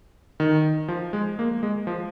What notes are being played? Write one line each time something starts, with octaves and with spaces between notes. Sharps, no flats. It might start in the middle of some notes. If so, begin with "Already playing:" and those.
D#3
F3
G#3
A#3
G#3
F3